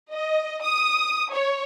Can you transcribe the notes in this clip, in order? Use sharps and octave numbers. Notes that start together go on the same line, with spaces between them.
D#5
D#6
C#5